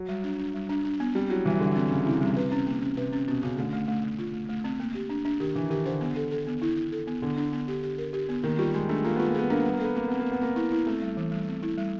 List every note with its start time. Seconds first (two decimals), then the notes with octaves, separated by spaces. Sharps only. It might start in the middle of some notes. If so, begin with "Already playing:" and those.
Already playing: F#3
0.09 G3
0.24 D4
0.39 D4
0.54 G3
0.69 D4
0.85 D4
1.00 B3
1.15 G3 C4
1.30 F#3 E4
1.45 E3 G3
1.60 D3 G3
1.76 D3 C4
1.91 C#3 C4
2.06 C3 E4
2.21 C3 G3
2.36 B4
2.52 C#4
2.67 A#3
2.82 C#4
2.97 C3 B4
3.13 C#4
3.28 B2 C#4
3.43 C#3 F#4
3.58 D3 A3
3.73 A3
3.88 A3
4.04 A3
4.19 F4
4.33 A3
4.49 A3
4.64 C4
4.80 A#3
4.95 G4
5.10 D4
5.25 D4
5.40 D#3 G4
5.55 E3 D4
5.70 D#3 G4
5.86 D3 C5
6.01 B3
6.16 A4
6.31 A4
6.47 B3
6.62 E4
6.77 E4
6.92 A4
7.07 B3
7.22 D3 B3
7.37 D4
7.53 B3
7.68 G4
7.83 G4
7.98 A#4
8.13 G4
8.29 B3
8.43 D#3 A#3
8.59 G3 F4
8.74 G#3 G#4
8.89 A3 D4
9.04 A#3 F4
9.16 B3 F4
9.28 A#3
9.35 B3 G#4
9.50 A#3 D4
9.62 G3 B3
9.74 A#3
9.80 B3 A4
9.95 A#3 C4
10.08 B3 C4
10.20 A#3
10.26 C4
10.32 B3
10.41 A#3 C4
10.56 E4
10.72 E4
10.87 A3 C4
11.02 G3
11.17 E3
11.32 G3
11.48 C4
11.62 E4
11.78 G3